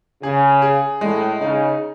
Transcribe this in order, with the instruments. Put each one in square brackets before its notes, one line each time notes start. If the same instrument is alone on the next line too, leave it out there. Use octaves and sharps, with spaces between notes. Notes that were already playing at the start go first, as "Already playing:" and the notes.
[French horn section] C#3 [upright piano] G#4
[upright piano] G#4
[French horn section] A2 [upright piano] G#3
[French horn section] C#3 [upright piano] D#4